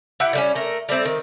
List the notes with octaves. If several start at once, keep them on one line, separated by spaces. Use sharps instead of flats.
E4 G4 F#5
D3 G3 C#4
A3 A#4
G3 A3 C4 A4
D#3